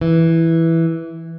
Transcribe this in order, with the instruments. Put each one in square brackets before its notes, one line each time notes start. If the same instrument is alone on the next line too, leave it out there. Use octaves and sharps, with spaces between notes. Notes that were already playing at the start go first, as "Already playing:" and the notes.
[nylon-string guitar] E3